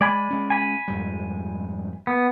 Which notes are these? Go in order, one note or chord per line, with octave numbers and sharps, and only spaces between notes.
G#3 D5 G#5 B5
G#3 C#4
G#5 B5
F2 G#2 G3
B3